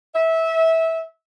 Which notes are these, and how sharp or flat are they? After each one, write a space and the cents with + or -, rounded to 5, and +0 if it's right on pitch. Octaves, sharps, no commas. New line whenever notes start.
E5 -20